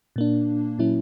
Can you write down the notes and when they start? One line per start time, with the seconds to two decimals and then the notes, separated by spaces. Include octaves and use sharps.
0.16 A#2 A#3 D4
0.79 A#2 F#3 A#3 C#4 E4